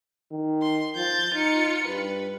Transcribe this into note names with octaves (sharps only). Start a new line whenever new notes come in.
D#3
C6
F3 G6 A6
D#4 F4 C#7
G2 B4